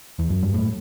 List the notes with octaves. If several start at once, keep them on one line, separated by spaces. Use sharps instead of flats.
E2
F#2
G2
A2